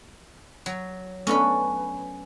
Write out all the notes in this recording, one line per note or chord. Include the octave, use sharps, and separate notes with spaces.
F#3
A3 B3 C#4 D4 B4